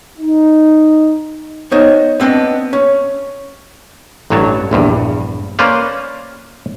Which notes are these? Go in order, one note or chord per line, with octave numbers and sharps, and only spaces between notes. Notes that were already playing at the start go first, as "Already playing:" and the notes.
D#4
B3 D#4 C5 C#5 D#5
B3 C4 D4 D#5
C#4
A1 G2 F#3 C#5 A5
A#1 E2 G2
A#3 C#4 B4 C5 D5 F5